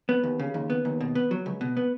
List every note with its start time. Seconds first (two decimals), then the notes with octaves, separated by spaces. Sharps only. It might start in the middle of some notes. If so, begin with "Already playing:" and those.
0.09 B3
0.23 D#2
0.39 C#3
0.54 D#2
0.70 B3
0.85 D#2
1.00 B2
1.15 B3
1.31 F#3
1.46 C#2
1.61 B2
1.77 B3